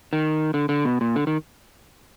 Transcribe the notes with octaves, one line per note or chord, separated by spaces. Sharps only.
D#3
D3
D3
B2
A#2
D3
D#3